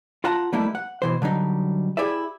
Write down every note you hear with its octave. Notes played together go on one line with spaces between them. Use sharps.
F4 F5 F#5 A5 A#5
F3 G3 A3 A#3 D#4 E4
F#5
B2 E3 C5
D3 F#3 G3 D#4
E4 G4 G#4 D5 E5